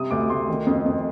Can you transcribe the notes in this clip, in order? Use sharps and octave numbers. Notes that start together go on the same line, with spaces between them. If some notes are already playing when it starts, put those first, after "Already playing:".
Already playing: C3 G3 D#6
D2 D6
D2 C6
D#3
F2
F2